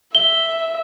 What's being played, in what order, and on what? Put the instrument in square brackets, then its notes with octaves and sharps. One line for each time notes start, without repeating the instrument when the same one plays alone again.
[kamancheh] E5 [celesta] G7